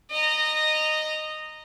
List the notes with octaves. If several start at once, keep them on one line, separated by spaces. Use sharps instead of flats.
D#5 A#5